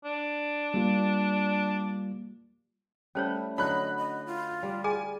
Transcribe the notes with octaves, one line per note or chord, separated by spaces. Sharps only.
D4
G3 A#3 F4
G3 A3 C#4 E4 C5 C#5
D3 F#3 D#5 B5 F#6
D#5
F4
G3 D5
G#4 G#5